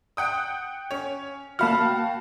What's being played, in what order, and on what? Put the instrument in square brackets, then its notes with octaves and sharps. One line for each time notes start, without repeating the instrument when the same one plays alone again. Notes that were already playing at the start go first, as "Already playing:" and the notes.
[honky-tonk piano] F#5 G5 D#6
C#4 C#5
[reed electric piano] A#3 B5 F6 [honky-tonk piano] F#4 F5 A5
[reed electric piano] G5